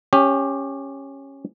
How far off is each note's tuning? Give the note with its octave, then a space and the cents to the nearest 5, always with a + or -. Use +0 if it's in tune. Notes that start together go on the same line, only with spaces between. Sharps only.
C#4 -10 G4 +15